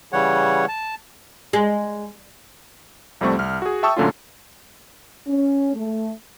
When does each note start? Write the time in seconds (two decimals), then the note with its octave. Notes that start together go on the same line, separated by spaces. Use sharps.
0.13 C#3 E3 G3 C#5 F#5
0.68 A5
1.53 G#3
3.21 C2 F2 G3 A3 C4 C#6
3.39 C2 F6
3.62 F#4 G#4
3.83 E5 G5 A5 C#6 D#6 E6
3.97 F#2 A#2 D3 A3 C#4 F4
5.27 C#4
5.74 A3